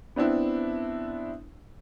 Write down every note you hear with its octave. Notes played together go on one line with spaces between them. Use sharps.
B3 C4 D4 E4